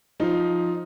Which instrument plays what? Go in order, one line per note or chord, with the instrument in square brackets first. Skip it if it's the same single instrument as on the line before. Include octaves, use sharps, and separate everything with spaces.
[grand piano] F3 D#4 F4